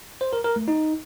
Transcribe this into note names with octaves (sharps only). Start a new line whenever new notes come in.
C5
A#4
A#4
A3
D#4